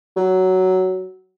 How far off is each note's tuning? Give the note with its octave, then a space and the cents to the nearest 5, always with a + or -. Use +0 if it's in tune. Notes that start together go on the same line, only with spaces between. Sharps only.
F#3 +10